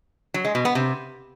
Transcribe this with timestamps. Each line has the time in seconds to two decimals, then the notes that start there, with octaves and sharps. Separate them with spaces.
0.34 F#3
0.45 G#3
0.55 B2
0.65 B3
0.75 C3